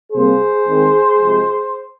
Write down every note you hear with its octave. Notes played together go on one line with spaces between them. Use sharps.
C3 G3 A#3 G#4 C5
D#3 G#3 C4
C3 F3 G#3